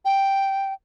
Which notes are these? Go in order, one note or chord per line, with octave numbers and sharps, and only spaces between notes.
G5